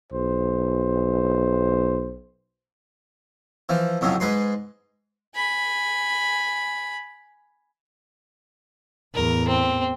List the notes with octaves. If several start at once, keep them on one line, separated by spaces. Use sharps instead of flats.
B1 C5
E3 F3
F2 A2 C#3 F#3
G#2 G#3 B4 C6
G#5 B5
E2 A2 A#4
C4